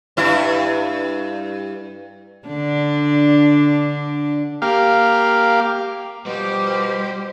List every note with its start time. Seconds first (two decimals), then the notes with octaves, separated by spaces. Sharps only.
0.17 G2 E4
2.47 D3 D4
4.62 A#3 G4 F5
6.26 B2 F3 G3 G4 C5 D6